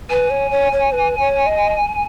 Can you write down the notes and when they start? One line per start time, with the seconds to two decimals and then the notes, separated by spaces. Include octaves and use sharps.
0.10 B4 G#5
0.30 C#5
0.51 C#5
0.72 C#5
0.92 B4
1.19 C#5
1.46 D#5